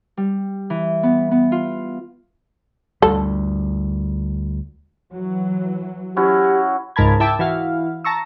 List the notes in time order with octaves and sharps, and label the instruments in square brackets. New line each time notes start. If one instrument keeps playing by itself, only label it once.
[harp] G3
E3
B3
B3
F4
[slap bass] D2 G3 [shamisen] A4
[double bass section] E3 F#3
[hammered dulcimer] C#4 E4 F#4 [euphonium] G4
[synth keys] C#2 G#2 A#4 A5 B5 G#6
E4 E5 G5 A5 D6
E3 E4 F#4 F5
A5 A#5 C#6 E6